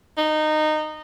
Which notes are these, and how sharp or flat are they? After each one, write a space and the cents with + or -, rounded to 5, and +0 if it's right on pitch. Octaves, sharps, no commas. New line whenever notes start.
D#4 -15